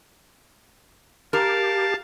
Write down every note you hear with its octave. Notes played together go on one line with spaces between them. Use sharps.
G4 A#4 F5 A5